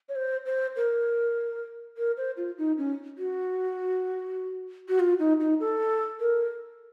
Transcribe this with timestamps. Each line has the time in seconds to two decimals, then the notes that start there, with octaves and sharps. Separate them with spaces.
0.09 C#5
0.15 C5
0.46 C5
0.76 A#4
1.97 A#4
2.17 C5
2.37 F4
2.58 D#4
2.78 C#4
3.18 F#4
4.88 F#4
4.99 F4
5.19 D#4
5.40 D#4
5.60 A4
6.20 A#4